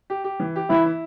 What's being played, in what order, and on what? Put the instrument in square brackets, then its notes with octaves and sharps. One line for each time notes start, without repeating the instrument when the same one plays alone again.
[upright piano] G4
G4
E3
G4
[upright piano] E3 [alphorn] E4
[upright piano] E4